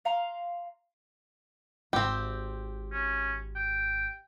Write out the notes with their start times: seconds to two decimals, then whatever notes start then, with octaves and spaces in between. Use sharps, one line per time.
0.05 F5 A#5 C6
1.93 G#1 C4 G4
2.93 C#4
3.56 G5